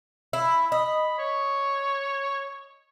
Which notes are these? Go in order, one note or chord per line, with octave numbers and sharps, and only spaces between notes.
E4
D#5 B5
C#5